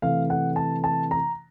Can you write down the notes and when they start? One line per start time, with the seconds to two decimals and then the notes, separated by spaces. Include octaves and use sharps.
0.02 C3 E3 A3 F5
0.30 F#5
0.56 A5
0.84 A5
1.11 A#5